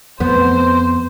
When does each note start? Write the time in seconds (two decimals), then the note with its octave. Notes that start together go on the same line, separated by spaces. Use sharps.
0.20 F2 B3 C5